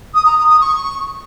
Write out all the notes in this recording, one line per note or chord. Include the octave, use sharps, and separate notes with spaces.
D#6
A#5
D#6
D#6
C#6